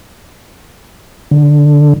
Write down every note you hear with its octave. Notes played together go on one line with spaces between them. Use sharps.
D3